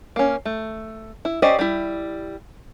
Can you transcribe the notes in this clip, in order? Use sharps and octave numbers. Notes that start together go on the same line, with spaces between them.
A#3 C#4
A3
E4
C#4 G4 C5 D5 D#5
G3 E4